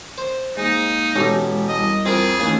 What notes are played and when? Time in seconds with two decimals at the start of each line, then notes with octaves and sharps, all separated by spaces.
0.18 C5
0.57 G#3 A#3 D#4
1.15 E1 G#3 C#4 G4 A4
1.68 C2 D#5
2.05 F2 C4 G#4 A#4
2.40 A1 D#2 G#5